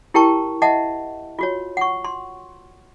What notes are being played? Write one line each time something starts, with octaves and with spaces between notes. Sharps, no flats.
E4 G4 A#4 G5 A5 C#6
D#5 E5 F#5 A5
F4 F#4 C#5
F#5 C#6
C6